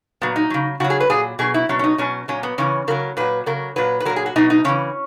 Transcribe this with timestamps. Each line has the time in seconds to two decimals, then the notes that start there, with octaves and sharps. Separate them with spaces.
0.22 A#2 F#3 B3
0.36 D#4
0.50 C#3 F#3
0.80 C#3 F#4
0.84 F#3
0.90 G#4
1.00 B4
1.10 A#2 F#3 G#4
1.39 B2 F#3 G#4
1.54 E4
1.69 B2 F#3 C#4
1.79 C#4
1.84 D#4
1.98 B2 F#3 C#4
2.28 A#2 F#3 C#4
2.43 B3
2.58 C#3 E3 C#4
2.88 C#3 F#3 A#4
3.17 A#2 F#3 B4
3.46 C#3 F#3 A#4
3.76 A#2 F#3 B4
4.00 B4
4.05 F#3 A#4
4.10 A#2
4.16 G#4
4.26 F#4
4.36 B2 F#3 D#4
4.50 D#4
4.64 C#3 E3 C#4